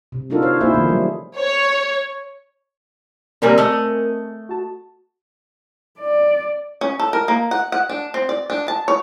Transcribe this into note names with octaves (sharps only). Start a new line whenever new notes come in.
C3
D4 D#4 F4 F#4 A4 A#4
C5 C#5 F5
A#3 D#4 E4 G#4 C5 E5
D#3 F3 A3 A#3
F#3 G3
C#5
D3 G3 A#3 C4 A#4 G#5
A3 D#5
F#4 A5
D5
C#4
A4
A#4
A#3
F#5
F#5
D4
C4
D5
D4
A5
C#5